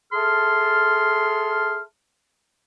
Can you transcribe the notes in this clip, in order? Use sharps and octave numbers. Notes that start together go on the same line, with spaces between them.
G#4 A4 E5 A5 C6 F6